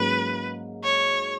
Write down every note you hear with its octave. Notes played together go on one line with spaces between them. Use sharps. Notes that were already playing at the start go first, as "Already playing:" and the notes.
Already playing: G#2 F#3 A#3 C#4 B4
C#5